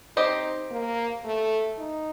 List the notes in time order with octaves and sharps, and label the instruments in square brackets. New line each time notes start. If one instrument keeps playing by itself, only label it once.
[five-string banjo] C4 G4 C5 D#5 [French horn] D#4
[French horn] A#3
A3
D#4